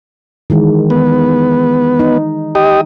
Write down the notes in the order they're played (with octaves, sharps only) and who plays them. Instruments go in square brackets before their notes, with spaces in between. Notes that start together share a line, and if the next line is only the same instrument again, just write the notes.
[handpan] D#3 E3 G#3
[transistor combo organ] B3
[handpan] D#4
[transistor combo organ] G4 D#5